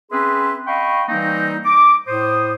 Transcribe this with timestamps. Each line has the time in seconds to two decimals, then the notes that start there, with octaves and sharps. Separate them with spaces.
0.12 C4 C#4 G#4 B4 E5 C6
0.67 D#5 F5 G5 B5 C#6
1.09 E3 G3 A#3 C4 D#4
1.65 D6
2.08 A2 C5 D#6